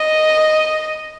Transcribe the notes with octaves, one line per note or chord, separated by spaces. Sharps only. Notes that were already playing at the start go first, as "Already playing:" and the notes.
Already playing: D#5